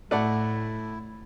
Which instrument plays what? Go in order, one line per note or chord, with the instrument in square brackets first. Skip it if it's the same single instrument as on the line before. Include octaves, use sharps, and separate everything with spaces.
[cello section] A2 [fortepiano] A3 D5 F#5 [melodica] E4